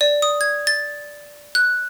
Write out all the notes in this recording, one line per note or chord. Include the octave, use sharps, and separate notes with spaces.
D5
D#6
G#6
A6
F#6